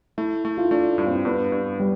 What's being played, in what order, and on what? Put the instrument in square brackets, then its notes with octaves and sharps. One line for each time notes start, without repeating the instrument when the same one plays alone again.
[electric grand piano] A3 [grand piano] E4
[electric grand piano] A3
[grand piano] F4
E4
[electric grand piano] A3 [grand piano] D4
[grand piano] D4
[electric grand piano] G2
[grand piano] C4
[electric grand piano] G2 [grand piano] B3
[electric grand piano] G2
[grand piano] G3